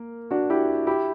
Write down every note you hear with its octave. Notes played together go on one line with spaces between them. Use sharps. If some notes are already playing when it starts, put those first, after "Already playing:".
Already playing: A#3
D4 F#4
E4 G4
E4 G4